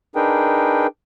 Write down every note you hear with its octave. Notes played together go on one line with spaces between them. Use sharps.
D4 D#4 G#4 A#4 B4 G5